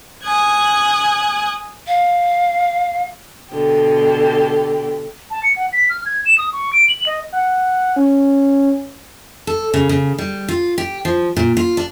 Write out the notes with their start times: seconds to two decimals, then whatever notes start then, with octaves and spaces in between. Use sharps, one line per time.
0.24 G#5 D#6 F#6 G#6
1.87 F5
3.52 B2 D3 G4
5.31 A5
5.43 C#7
5.56 F#5
5.73 B6
5.90 F6
6.06 G#6
6.26 E7
6.38 D#6
6.53 C#6
6.73 D7
6.88 F#7
7.06 D#5
7.32 F#5
7.96 C#4
9.47 A4
9.74 C#3
9.89 C#3
10.18 G3
10.48 F4
10.78 G4
11.05 F3
11.36 A#2
11.57 F4
11.77 D4